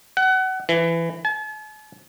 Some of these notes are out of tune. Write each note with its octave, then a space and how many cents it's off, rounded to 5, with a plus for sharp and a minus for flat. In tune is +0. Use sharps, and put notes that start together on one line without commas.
F#5 +25
E3 +15
A5 -45